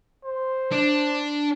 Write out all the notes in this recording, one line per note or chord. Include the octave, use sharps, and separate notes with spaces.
C5
D4